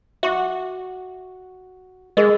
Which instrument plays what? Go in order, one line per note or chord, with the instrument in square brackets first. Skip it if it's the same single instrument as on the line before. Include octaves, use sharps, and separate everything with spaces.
[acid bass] F#4 [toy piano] E5 C#6 D6
[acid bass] G#3 [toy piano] G#4 A#4 D#5